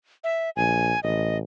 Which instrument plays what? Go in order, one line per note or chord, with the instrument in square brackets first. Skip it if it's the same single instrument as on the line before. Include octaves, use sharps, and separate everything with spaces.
[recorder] E5
[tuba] A#1 [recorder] G#5
[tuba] A1 [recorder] D#5